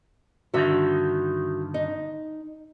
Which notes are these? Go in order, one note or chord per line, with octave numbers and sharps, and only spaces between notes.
G2 D3 D#3 F#4 E5
D#4